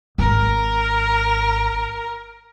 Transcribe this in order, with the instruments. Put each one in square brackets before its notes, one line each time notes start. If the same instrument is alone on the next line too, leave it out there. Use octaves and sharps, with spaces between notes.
[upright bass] G#1 [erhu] A#4